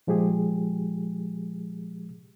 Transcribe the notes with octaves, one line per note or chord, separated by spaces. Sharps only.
A#2 F3 G#3 G4 G#4